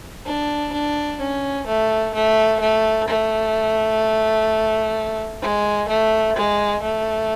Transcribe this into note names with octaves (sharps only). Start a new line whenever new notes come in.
D4
D4
C#4
A3
A3
A3
A3
G#3
A3
G#3
A3